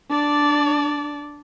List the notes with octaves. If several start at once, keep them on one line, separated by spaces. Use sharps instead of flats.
D4 D5